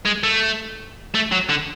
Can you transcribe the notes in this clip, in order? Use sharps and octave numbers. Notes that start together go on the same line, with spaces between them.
G#3
A3
A3
F#3
D3